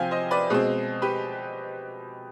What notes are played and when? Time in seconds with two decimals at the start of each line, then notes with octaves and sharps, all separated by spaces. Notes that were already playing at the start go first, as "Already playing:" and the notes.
Already playing: C3 F3 C4 F5 G5 G#5
0.11 C5 D#5
0.31 B4 D5
0.50 B2 G#3 C4 G#4
1.02 G4 B4